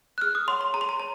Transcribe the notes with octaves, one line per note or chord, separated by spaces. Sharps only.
F#6
G#4 F6
D#6
C#5 F#5 C6
C6
G#4 A#5
C6
A#5
C#5 A#5